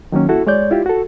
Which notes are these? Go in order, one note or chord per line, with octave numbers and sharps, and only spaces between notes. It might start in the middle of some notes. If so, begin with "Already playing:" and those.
D#3 F#3 A#3 C#4
E4 F#4 A4
G#3 C#5 D5 G6
E4 F4 G4
F#4 A4